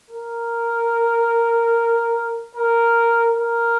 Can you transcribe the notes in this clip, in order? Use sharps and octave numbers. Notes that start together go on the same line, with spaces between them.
A#4
A#4
A#4